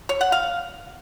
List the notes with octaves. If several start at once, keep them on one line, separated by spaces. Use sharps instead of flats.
C#5
F#5
F5